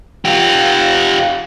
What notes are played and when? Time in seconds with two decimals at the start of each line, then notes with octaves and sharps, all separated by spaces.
0.25 F4 G4